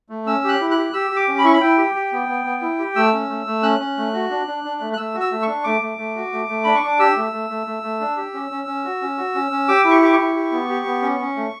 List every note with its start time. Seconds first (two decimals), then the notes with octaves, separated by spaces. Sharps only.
0.09 A3
0.26 C#4 E6
0.44 G4 F#6
0.61 E4
0.71 F#6
0.77 G4
0.93 G4 E6
1.11 G4
1.16 D6
1.28 C#4
1.38 B5
1.44 E4 C#6
1.53 B5
1.61 E4 G5
1.77 G4
1.95 G4
2.12 B3
2.28 B3
2.45 B3
2.61 E4
2.79 G4
2.95 A3 E6
3.13 C#4
3.29 A3
3.47 A3
3.63 C#4 F#6
3.79 C#4
3.97 A3
4.13 F#4
4.30 D4
4.47 D4
4.64 D4
4.81 A3
4.93 F#6
4.97 A3 E6
5.15 F#4
5.20 E6
5.31 A3
5.43 D4 C#6
5.64 A3 D6
5.81 A3
5.98 A3
6.16 F#4
6.32 A3
6.48 A3
6.64 D4 B5
6.75 C#6
6.83 D4 D6
6.99 G4 E6
7.16 A3
7.32 A3
7.50 A3
7.67 A3
7.83 A3
8.00 D4
8.17 G4
8.34 C#4
8.51 C#4
8.67 C#4
8.85 F#4
9.01 C#4
9.18 F#4
9.35 C#4
9.51 C#4
9.68 G4 D6
9.84 E4
9.91 C#6
10.02 G4 D6
10.13 C#6
10.19 E4
10.35 G4
10.52 B3
10.69 G4
10.86 B3
11.02 C#4
11.19 C#4
11.36 A3